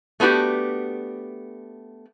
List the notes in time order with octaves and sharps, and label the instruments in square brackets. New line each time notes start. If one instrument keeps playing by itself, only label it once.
[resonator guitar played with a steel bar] A3 B3 D4 F#4 G4